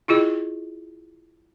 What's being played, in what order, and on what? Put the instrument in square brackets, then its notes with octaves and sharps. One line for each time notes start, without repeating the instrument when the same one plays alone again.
[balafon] E4 F4 G#4 D#5